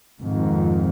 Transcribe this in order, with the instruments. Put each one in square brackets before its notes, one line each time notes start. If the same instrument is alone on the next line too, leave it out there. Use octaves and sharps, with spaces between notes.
[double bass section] F2 G#2 D#3